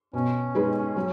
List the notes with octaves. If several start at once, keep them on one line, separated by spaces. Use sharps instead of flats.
B2 C#4
G#3 D#4 G#4 B4
F#3